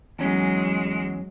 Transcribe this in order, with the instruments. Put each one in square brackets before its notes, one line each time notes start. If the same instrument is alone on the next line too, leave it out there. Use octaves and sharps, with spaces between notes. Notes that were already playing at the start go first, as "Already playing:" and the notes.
[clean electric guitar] E2 C#4 [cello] F#3 G#3